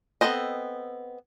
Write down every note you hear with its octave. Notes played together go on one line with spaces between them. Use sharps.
B3 C4 A4 C5 D#5